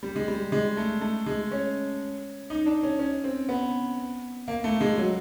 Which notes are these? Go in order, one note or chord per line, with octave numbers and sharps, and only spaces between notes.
G3
G#3
G3
G#3
A3
A3
G#3
C#4
D#4
D4
C#4
C#4
C4
B3
A#3
A3
G#3
F#3